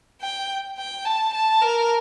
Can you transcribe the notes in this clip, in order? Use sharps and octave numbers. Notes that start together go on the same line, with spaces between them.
G5
G5
A5
A5
A#4